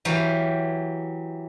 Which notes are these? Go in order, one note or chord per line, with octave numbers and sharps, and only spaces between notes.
E3 F#3 G4 F5